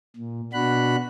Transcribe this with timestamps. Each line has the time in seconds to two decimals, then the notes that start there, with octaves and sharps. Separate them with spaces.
0.16 A#2
0.53 B2 D4 F#4 B5 F#6